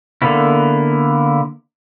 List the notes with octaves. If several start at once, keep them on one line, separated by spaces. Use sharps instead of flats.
D3 A#3 B3 E4